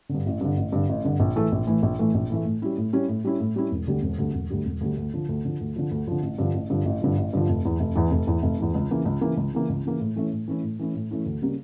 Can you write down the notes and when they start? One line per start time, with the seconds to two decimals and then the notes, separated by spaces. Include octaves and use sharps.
0.09 D3
0.15 G2
0.26 A1
0.41 G2 D3
0.57 A1
0.72 G2 D3
0.89 A1
1.04 G2 D3
1.20 A#1
1.36 A2 E3 A3
1.52 A#1
1.67 A2 E3 A3
1.83 A#1
1.99 A2 E3 A3
2.14 A#1
2.30 A2 E3 A3
2.45 A2
2.62 G3 C#4 E4
2.78 A2
2.93 G3 C#4 E4
3.08 A2
3.24 G3 C#4 E4
3.40 A2
3.56 G3 C#4 E4
3.71 E1
3.87 D2 D3 G3
4.02 E1
4.18 D2 D3 G3
4.34 E1
4.50 D2 D3 G3
4.66 E1
4.81 D2 D3 G3
4.97 D2
5.14 D3 F3
5.29 D2
5.45 D3 F3
5.61 D2
5.76 D3 F3
5.91 D2
6.07 D3 F3
6.22 A1
6.38 G2 D3 F3
6.54 A1
6.70 G2 D3 F3
6.85 A1
7.01 G2 D3 F3
7.18 A1
7.33 G2 D3 F3
7.49 F1
7.65 E2 E3
7.80 F1
7.95 E2 E3
8.11 F1
8.27 E2 E3
8.43 F1
8.59 E2 E3
8.75 C#2
8.90 C#3 E3 A#3
9.05 C#2
9.21 C#3 E3 A#3
9.37 C#2
9.53 C#3 E3 A#3
9.69 C#2
9.85 C#3 E3 A#3
10.00 A2
10.16 E3 A3 C#4 E4
10.32 A2
10.48 E3 A3 C#4 E4
10.63 A2
10.79 E3 A3 C#4 E4
10.95 A2
11.11 E3 A3 C#4 E4
11.26 D2
11.42 C#3 G3 A#3 C#4